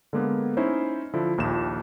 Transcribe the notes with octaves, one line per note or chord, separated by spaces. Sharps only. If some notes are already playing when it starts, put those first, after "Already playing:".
D3 G#3 A#3 B3
C#4 D#4 E4 C5 C#5
D3 F3 E4
A#1 D#2 F4 E7